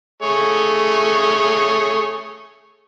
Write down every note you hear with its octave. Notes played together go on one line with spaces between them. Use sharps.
A3 G#4 C#5